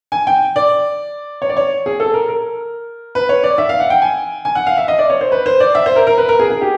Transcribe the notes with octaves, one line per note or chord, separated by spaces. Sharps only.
G#5
G5
D5
C#5
D5
C#5
G#4
A4
A#4
A#4
B4
C#5
D5
E5
F5
F#5
G5
G#5
G#5
F#5
F5
E5
D#5
D5
C#5
C5
B4
C5
D5
E5
C5
A#4
A#4
B4
A#4
G#4
G#4
G4